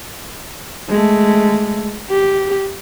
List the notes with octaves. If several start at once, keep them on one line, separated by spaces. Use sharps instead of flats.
G#3 A3
G4